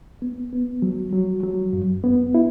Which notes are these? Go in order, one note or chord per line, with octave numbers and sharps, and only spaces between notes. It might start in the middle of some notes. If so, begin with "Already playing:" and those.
B3
B3
F#3
F#3
F#3
F#2
B3
E4